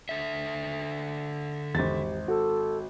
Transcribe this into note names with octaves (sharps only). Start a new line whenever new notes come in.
D3 E5
G#1 E2 G4 A6
F#4 A4